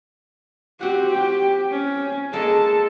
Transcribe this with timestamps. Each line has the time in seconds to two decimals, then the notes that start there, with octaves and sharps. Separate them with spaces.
0.81 C4 F#4 G4 F#5
1.13 G4 G5
1.71 C#4
2.33 G#3 A#3 A4